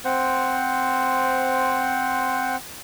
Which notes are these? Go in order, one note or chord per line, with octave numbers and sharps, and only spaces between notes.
C4 C5 F#5